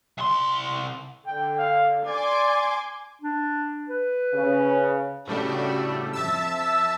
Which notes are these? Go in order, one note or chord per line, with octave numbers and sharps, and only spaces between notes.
C2 C6
D3 G5
F5
D5 G#5 C6 D6
D4
B4
C#3
A2 C#3 G3 A3 D4 F#4
F2 F3 E5 A5 E6